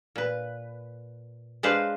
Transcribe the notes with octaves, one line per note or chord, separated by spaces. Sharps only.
A#2 B4
G#3 D4 B4 C5 F5